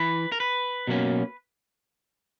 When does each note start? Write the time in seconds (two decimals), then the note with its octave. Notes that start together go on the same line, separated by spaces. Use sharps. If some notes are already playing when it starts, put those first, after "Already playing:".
Already playing: E3 B4
0.32 A#4
0.40 B4
0.87 B2 F#3 A#3 C#4